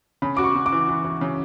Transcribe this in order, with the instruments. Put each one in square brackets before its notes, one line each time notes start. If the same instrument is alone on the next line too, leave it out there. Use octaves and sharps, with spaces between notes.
[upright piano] C#3 [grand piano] B5
[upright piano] F#4 [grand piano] D6
[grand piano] C#6
[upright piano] C#3
[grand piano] D6
[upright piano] E3
E3
E3
C#3